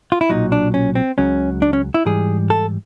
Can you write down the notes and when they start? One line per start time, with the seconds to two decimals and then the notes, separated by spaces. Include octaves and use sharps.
0.12 F4
0.21 E4
0.29 B1 A#2 F#3 D#4
0.52 D4
0.74 C#4
0.95 C4
1.18 C#2 C#3 F#3 C#4
1.62 D4
1.73 C#4
1.94 E4
2.06 G#2 E3 G3 G#4
2.50 A4